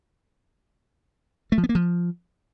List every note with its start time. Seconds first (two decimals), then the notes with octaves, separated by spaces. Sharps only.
1.52 A3
1.58 F3
1.64 B3
1.69 A#3
1.75 F3